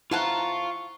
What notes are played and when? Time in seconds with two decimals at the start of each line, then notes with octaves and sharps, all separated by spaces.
0.11 F2 E4 F4 F5 F#5 A5 A#5 C#6